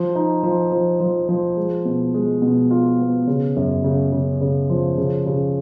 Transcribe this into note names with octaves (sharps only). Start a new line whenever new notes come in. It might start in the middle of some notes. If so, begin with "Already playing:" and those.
Already playing: F3
D#4
F3
F3
F3
F3
G#3
B2
G#3
B2
F4
B3
C#3
F#2
C#3
C#3
C#3
F3
C#3
C#3